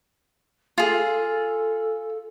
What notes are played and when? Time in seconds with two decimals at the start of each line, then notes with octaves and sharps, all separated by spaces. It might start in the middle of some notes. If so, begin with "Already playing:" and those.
0.78 F4 G#4 A4